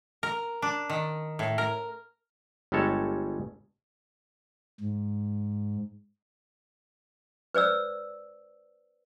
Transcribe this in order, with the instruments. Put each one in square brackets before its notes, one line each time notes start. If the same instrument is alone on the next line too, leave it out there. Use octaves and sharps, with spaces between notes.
[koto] A#4
D4
D#3
A2
A#4
[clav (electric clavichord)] G1 G3 G#3 A4 C#5
[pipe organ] G#2
[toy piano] B4 C5 D5 E6